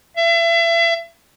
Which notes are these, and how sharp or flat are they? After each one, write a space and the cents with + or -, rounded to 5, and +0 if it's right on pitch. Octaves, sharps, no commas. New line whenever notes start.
E5 +35